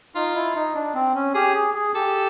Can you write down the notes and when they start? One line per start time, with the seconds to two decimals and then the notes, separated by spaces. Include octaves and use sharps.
0.15 D#4 F4
0.35 E4
0.55 D#4
0.75 D4
0.95 C4
1.15 C#4
1.35 G4 G#4
1.55 G#4
1.74 G#4
1.95 G4 A4